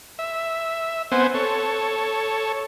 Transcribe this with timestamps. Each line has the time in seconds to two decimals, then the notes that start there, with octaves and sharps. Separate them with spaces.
0.19 E5
1.12 B3 C4 C5 F#5 G#5
1.34 A4 C#5